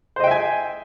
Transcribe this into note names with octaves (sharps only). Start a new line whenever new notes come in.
C5 D#5 E5 G5 G#5